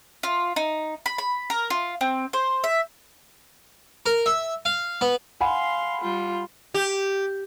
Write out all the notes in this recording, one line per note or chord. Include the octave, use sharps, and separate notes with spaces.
F4
D#4
B5
B5
A#4
F4
C4
C5
E5
A#4
E5
F5
B3
F5 F#5 G#5 B5 C6
G3 F4
G4